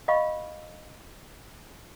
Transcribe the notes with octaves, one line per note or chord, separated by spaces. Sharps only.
D#5 F5 B5 C#6